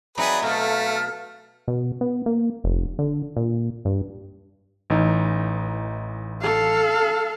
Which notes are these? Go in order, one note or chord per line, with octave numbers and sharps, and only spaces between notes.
F#3 C4 D#4 G#4 B4 D5 E5 A#5
B2 A3 A4 F5 F6
B2
B3
A#3
F1
D3
A#2
G2
A1 E3 D#4
A4 F5